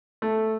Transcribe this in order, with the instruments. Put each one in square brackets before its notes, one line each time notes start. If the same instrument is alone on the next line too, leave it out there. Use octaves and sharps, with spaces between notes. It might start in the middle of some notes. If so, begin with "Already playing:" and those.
[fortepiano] A3